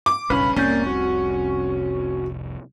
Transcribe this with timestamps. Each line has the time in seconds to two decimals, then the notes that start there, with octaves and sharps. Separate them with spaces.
0.06 D6
0.30 F#1 B1 G2 C#4 B4 F5 B5
0.56 F1 C2 A#3 C4 C#4 D5 G6
0.87 F#4